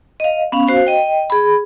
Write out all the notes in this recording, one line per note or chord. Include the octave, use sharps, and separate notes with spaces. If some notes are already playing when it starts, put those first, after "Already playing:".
D#5 F5
B3 C#4 F5
F#4 C5 F5
D#5 G5
G#4 B5